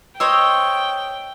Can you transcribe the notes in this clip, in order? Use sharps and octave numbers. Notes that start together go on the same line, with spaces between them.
C5 C#5 D#5 G5 E6